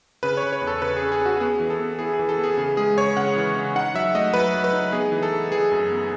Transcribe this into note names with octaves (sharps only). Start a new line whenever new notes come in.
C#3 B4
C#5
C#3
C#5
E2
A4
C#3 B4
G#4
C#4
G#4
C#4
F#4
B3 G#4
E3
A4
B3
E4 G#4
G#4
E3
A4
B3
G#4
C#3 G#4
G#3 G#4
C#3 C#5
C#3 F#5
E3
C#3
D#4 F#5
F#3 E5
A3 D#5
F#3 B4
F#3
B4
D#4
B3 G#4
E3
A4
E3
E3 G#4
F#2
B3